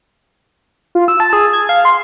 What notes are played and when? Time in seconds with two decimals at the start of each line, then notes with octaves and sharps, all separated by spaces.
0.95 F4
1.08 E6
1.20 A5
1.33 G#4
1.53 G#6
1.69 F5
1.85 C6